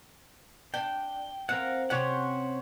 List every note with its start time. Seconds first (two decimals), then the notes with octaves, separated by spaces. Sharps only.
0.74 D4 G5
1.49 C4 A#4 F5 F#5
1.90 C3 C#4 G4 C5 C#5 F#5